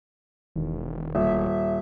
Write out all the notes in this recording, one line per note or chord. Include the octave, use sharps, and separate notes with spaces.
E1 D#3
D#1 E5